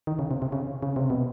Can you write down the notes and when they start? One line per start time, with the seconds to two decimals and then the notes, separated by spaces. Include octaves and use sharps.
0.07 D#3
0.19 C#3
0.31 C3
0.42 C3
0.52 C#3
0.83 C#3
0.96 C3
1.10 B2